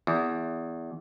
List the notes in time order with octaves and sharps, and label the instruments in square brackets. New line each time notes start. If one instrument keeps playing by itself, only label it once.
[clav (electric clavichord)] E2